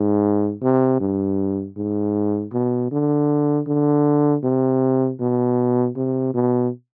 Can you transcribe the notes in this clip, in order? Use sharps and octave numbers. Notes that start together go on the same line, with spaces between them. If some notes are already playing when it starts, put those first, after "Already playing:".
Already playing: G#2
C3
G2
G#2
B2
D3
D3
C3
B2
C3
B2